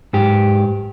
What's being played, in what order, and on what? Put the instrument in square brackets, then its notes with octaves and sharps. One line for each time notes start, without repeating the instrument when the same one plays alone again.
[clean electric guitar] G#2 G4